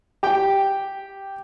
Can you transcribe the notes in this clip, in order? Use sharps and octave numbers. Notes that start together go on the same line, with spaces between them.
G4 G5